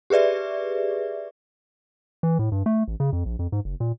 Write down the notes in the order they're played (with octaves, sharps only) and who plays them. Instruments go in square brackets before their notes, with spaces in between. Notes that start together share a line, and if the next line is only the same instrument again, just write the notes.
[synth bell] G4 G#4 B4 D5 E5
[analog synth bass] E3
A2
G2
A3
A1
C#3
F2
A#1
F2
G#2
F#1
A#2